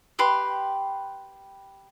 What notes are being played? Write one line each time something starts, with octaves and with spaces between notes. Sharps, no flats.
G4 B4 C6